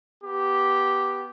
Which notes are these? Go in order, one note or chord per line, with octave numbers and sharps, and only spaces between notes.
B3 G4